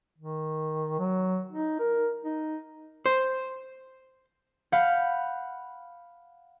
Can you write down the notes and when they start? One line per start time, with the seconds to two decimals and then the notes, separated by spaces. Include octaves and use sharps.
0.18 D#3
0.99 F#3
1.52 D#4
1.79 A#4
2.25 D#4
3.06 C5
4.72 F5 F#5 B5 F#6 G6